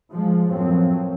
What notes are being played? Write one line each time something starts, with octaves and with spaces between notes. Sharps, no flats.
F3 G#3
F#2 A2 F3 F#3 C4